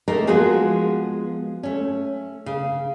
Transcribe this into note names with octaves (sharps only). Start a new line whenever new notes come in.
A3 A#3 C4 D#4 A#4
F3 G#3 B3 F4 F#4 G#4
A3 C#4
C#3